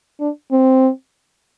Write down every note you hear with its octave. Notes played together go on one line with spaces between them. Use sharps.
D4
C4